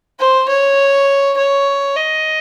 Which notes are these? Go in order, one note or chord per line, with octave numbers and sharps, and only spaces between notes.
C5
C#5
C#5
D#5